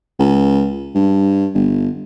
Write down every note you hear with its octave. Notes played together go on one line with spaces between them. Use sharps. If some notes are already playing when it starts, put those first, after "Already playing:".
C#2
G2
G1